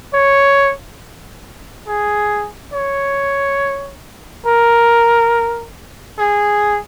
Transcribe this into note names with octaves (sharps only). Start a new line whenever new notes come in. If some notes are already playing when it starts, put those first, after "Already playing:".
C#5
G#4
C#5
A#4
G#4